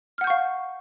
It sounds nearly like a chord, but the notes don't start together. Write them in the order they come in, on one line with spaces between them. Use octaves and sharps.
F6 F#5 G6 C#6 F5